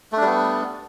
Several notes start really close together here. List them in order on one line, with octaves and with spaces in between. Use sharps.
A3 D4 G3 B3